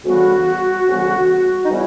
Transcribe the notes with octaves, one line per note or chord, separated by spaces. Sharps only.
D2 C#3 E3 G3 B3 F#4
D2 C#3 E3 G3 B3
D#4
C#3 E3 G3 B3 E4